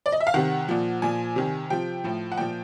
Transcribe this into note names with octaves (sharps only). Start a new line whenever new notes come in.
D5
D#5
E5
F5
C3 D#3 F#5
A#2 F3
A#2 F3 G#5
C3 D#3
C3 F3 G5
A2 F3
F#5
A#2 F3 G5